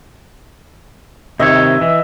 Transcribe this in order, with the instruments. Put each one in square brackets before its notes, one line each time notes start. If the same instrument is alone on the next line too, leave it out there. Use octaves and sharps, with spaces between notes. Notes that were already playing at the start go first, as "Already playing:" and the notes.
[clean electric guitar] C3 D#3 C#5 [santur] D#5 E5
[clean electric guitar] E3